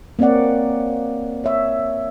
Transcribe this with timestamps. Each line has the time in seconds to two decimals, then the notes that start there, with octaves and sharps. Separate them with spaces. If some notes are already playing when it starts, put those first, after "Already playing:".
0.19 A#3 C4 C#5 D5 F#5
1.44 C#5 E5